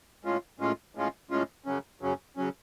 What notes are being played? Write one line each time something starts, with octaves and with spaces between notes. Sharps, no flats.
A2 G#3 C#4 F4
A2 G#3 C#4 F4
A2 G#3 C#4 F4
A2 G#3 C#4 F4
F#2 C#3 F#3 C#4
F#2 C#3 F#3 C#4
C#3 F#3 C#4